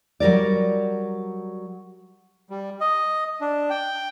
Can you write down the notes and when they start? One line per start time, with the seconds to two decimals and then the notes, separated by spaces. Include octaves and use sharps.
0.20 F#3 G3 A#4 D5
2.50 G3
2.81 D#5
3.41 D4
3.70 G5